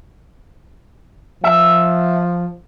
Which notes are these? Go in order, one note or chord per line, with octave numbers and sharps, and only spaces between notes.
F3 E5